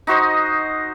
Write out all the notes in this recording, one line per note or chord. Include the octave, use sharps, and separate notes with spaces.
D#4 F#4 C5 D#5